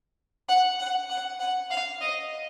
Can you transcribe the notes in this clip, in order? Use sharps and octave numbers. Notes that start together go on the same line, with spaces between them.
F#5
F#5
F#5
F#5
F5
D#5